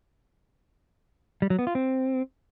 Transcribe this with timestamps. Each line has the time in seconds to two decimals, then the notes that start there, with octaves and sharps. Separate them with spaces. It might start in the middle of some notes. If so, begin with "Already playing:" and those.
1.42 G3
1.50 F#3
1.59 B3
1.67 F4
1.75 C4